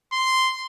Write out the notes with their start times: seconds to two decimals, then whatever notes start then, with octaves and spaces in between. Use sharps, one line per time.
0.13 C6